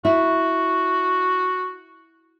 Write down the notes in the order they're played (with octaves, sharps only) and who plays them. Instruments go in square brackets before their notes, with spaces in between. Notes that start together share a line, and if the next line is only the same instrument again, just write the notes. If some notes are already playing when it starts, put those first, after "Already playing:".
[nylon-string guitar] E4 [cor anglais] F#4